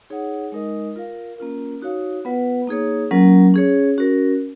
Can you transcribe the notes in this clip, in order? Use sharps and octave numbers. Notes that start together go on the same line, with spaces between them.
D#4 G#4 C#5 F#5
G#3 D#4 A#4 D#5
F4 A#4 F5
A#3 C#4 F4 A#4
D#4 F#4 C#5 F5
B3 F4 B4 F#5
A#3 D#4 G#4 C#5
F#3 A#3 C#4 F4 A#4
C#4 G#4 C#5
C#4 F#4 A#4